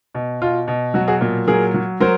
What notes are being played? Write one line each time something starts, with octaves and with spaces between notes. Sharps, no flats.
B2
B2 F4
B2
F#3 F#4
F#4 G#4
A#2
F#3 G#4 A#4
F#3
F#3 A#4 C5